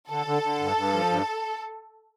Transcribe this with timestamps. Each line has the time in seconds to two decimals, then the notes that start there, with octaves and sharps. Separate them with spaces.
0.09 D3 A4
0.26 D3
0.43 D3
0.60 G2
0.77 G2
0.93 F3
1.10 G2